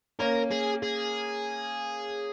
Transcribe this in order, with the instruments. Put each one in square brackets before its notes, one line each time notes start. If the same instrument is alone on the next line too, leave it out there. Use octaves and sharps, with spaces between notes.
[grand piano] A#3 C#4 [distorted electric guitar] A#4
[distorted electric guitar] G#4
G#4